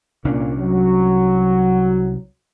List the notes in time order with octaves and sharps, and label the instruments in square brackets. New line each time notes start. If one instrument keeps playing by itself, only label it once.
[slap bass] C2 C#4 D4 [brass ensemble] A#2
[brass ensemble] F#3